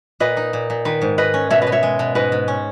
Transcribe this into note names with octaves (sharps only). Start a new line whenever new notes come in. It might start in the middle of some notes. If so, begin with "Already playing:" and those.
A#2 B4 D#5
D#4
A#2
A#2
D#3 B4
G#2
G#2 B4 D#5
C#4
B2 C#5 E5
B4 D#5
B2
C#5 E5
G#3
B2
G#2 B4 D#5
G#2
C#4